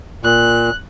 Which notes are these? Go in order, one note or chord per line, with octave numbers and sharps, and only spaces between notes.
A#2 F#6